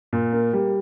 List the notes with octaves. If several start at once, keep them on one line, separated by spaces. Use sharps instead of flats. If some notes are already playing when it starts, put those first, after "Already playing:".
A#2
A#3
G3